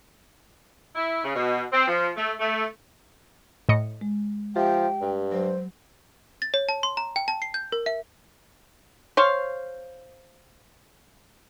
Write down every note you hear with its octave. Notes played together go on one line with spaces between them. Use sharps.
E4
C#3
B2
C4
F3
A3
A3
A2 D#5 C#7
G#3
F3 G4 E5 G5
G2
F#3 C5
A6
C#5
A5
C6
A#5
G5
A5
C7
G6
A#4
E5
C5 C#5 F5